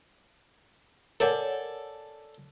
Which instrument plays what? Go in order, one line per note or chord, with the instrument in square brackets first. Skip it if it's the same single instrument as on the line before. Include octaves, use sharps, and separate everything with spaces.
[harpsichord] A4 D5 G#5 [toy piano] A#4 C#5 F#5